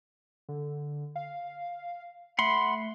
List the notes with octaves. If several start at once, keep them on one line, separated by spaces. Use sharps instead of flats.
D3
F5
A3 F#5 B5 C6